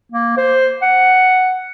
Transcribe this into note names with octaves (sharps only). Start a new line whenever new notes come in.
A#3
C5
F#5